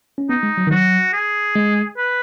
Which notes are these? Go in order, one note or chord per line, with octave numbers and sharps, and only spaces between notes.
C#4
B3 D#4
G#3
F#3
D#3
F#3 F#4
G#4
G#3
B4